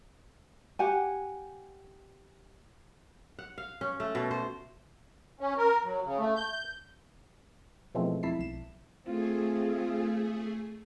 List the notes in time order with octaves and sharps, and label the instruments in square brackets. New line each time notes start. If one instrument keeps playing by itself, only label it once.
[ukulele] G4 F#5 G#5
[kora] F#5
F5
C#4
A3
B2
C5
[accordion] C#4
A#4
F#3
C#3
A3
G6
[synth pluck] B2 E3 F3 G#3 A3 C4
F2 E4 A5 B6 C7
B1 E7
[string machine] A3 G#4 [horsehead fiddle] C4 F4